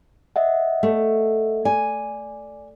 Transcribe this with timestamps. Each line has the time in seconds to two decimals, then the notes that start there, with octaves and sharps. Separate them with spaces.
0.36 D#5 E5 F#5
0.83 A3
1.65 D5 G#5